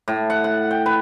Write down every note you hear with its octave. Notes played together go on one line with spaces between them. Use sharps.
A2
F#5
F#5
G5
B4